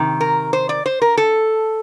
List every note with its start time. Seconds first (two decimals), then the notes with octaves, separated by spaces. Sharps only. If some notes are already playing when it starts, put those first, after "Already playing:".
Already playing: C3 D#3
0.21 A#4
0.53 C5
0.69 D5
0.86 C5
1.02 A#4
1.17 A4